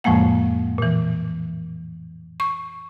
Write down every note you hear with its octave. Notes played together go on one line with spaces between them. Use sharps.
F2 A2 F3 G#3 A#3 F#5
A#2 E3
C#6